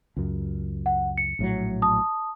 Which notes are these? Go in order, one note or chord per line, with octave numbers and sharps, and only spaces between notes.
C#2 F#2
F#5
C#7
A#1 A2 F#3
A5 D#6